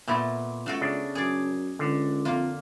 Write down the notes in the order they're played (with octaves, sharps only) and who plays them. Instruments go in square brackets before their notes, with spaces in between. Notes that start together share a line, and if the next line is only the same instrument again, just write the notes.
[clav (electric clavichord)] A#2 [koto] A3 B3 E4
[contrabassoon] C#2 [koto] A3 F#4 A4
[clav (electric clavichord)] C#3 D4
[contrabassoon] F#2 [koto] G#4 D5
[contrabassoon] C#2 [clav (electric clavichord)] D3
[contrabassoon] F2 [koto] A#3 F4